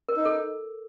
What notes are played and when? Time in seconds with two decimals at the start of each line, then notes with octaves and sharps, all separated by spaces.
0.09 A#4
0.17 D#4
0.25 A4